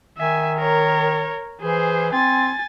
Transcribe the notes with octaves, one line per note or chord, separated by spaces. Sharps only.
D#3 E5 G#5
A#4 C#5
E3 G#4 C5
C4 G#5 A6